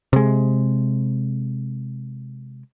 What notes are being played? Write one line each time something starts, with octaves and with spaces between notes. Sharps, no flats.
C3 G#3